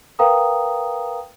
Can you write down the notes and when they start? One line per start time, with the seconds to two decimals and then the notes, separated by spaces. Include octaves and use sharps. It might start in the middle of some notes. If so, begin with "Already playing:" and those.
0.19 A#4 B4 F5 G5 A#5 D#6